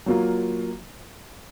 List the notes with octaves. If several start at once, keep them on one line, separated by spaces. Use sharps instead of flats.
F#3 A#3 F4